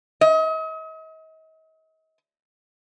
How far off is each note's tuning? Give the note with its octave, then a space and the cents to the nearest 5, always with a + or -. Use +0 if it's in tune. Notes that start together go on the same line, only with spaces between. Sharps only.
D#5 +40